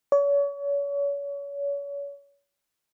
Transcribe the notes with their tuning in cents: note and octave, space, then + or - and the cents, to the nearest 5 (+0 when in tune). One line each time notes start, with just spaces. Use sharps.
C#5 +35